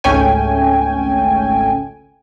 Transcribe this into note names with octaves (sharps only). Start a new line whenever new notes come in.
G#1 C#2 A3 C#4 G5 G#5